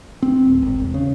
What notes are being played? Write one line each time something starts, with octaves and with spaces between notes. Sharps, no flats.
C4
D1
G#1
E1
C#3